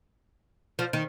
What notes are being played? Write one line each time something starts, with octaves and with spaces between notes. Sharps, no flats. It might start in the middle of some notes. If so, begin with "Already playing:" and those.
F3
D#3